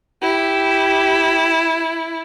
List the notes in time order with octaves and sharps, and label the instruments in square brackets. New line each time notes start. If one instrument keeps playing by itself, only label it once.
[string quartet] E4 [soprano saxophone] G4